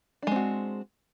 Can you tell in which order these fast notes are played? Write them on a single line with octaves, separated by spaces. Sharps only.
D4 G#3 C4 F#4